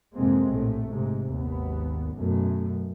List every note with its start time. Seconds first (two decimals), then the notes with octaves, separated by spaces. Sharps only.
0.15 F2 G#2 C3 G#3 A#3 C4
0.54 A#1 A2 A3
0.86 G#2 C3
1.30 G#1 D#2 B3
2.15 F#2 B2 A3